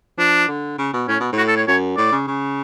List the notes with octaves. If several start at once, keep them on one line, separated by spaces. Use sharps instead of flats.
F3 D4
D3
C#3
B2
A2 C#4
B2
A2 F#4
A4
C#5
F#2 C#5
A2 D5
C#3
C#3